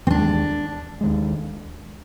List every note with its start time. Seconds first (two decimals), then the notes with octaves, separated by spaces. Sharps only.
0.07 C4
0.11 D#2 D#3 G#3 D4
1.01 D#2 D#3 G#3